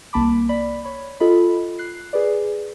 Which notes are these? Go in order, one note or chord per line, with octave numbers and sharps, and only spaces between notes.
C2 A#3 A5 B5 D6
D5 B5
C#5 B5
F4 A4 D#5 B5
F#6 C7
G#4 B4 D5